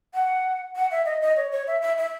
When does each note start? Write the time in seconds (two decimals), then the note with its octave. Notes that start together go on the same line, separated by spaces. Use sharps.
0.14 F#5
0.76 F#5
0.91 E5
1.06 D#5
1.22 D#5
1.37 C#5
1.52 C#5
1.67 E5
1.82 E5
1.98 E5